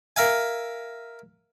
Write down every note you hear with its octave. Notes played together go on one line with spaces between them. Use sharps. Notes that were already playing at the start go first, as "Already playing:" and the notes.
A#4 E5 F5 G#5